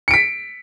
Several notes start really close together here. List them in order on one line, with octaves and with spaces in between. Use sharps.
C#7 D7 B6